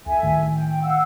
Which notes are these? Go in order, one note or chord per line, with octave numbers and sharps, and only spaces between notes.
C#2 A4 E5 G#5
A2 D#3
G5
F5 F#5 E6